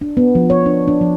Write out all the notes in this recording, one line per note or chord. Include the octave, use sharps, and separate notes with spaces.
D4
B3
F3
C#5
D4
D4
F3